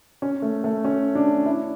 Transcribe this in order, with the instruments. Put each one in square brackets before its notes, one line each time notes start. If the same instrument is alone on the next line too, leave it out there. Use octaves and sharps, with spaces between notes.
[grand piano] C#4
A3
A3
C#4
D4
E4